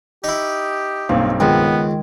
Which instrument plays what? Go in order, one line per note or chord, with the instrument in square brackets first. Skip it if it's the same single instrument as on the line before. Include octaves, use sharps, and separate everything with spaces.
[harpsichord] D#4 E4 [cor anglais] G4
[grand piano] B1 G2 C4 [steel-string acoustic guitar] A#3
[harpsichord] C#2 [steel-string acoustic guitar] D#3 G#3 G5 [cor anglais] B3